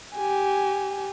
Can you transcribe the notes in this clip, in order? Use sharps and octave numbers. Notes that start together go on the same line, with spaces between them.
G4 G#5